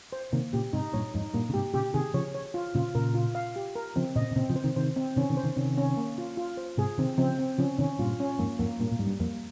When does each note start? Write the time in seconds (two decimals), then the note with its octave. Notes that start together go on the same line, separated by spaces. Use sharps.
0.13 C5
0.32 C3 D#3 A#3
0.53 A#2 C#3 G4
0.73 G#2 C3 D#4
0.93 G2 A#2 C#5
1.14 F2 G#2 D#4
1.34 G2 A#2 A#3
1.49 C#3
1.54 G#2 C3 G4
1.74 A#2 C#3 G4
1.94 C3 D#3 G#4
2.14 C#3 F3 C#5
2.34 C#5
2.54 F4
2.75 A#2 C#3 F4
2.95 A#2 C#3 A#4
3.15 F4
3.35 F5
3.56 G4
3.76 A#4
3.96 C#3 F3 C4
4.15 A#2 C#3 D#5
4.31 C3
4.36 A#2 C#3 C4
4.50 C#3 F3
4.56 C5
4.64 C3 D#3
4.76 C3 D#3 C5
4.96 C4
5.16 C3 D#3 C#4
5.30 C3 D#3
5.37 C5
5.43 C3 D#3
5.56 C3 D#3 C#4
5.78 C#4
5.97 A#3
6.18 F4
6.37 F4
6.57 C5
6.78 G#2 C3 G#4
6.98 C3 D#3 C4
7.18 C#3 F3 C4
7.39 C4
7.58 C#3 F3 C#4
7.78 C3 D#3 C#4
7.99 G2 A#2 F4
8.20 C#4
8.39 F2 G#2 A#3
8.59 F2 G#2 A#3
8.79 G2 A#2 A#3
8.92 A#2
8.99 G#2 G3
9.06 G2
9.19 F2 A#3